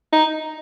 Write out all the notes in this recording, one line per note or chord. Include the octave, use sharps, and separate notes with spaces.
D#4